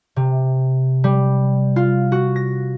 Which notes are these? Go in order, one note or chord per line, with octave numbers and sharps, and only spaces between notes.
C3
G3
F4
F#4
A#6